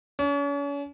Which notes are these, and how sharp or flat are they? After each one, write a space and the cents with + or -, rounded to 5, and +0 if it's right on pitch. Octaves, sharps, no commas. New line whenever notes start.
C#4 +40